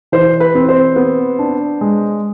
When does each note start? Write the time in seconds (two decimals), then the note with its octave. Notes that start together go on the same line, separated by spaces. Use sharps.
0.12 E3 C5
0.40 B4
0.55 C4
0.69 C5
0.96 B3
1.39 D4
1.81 G#3